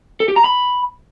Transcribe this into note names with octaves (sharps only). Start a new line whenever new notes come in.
A4
G4
A#5
B5